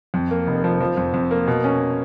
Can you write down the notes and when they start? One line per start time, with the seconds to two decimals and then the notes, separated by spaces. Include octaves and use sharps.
0.14 F2
0.31 A#3
0.47 F1
0.64 F3
0.80 F3
0.97 F2
1.14 F2
1.31 A#3
1.47 B2
1.64 C#4